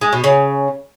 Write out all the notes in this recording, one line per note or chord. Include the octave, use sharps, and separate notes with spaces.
G#3
B2
C#3